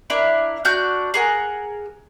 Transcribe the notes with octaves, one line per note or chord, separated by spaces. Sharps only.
D4 E4 A#4
D4 F#4 F6 G6
G#4 A#4 F#5